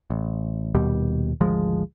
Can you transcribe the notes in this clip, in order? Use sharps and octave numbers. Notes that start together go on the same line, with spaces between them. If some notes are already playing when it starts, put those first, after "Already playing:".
A1
D#1 D#2 B2 G3
G#1 D2 F3 G#3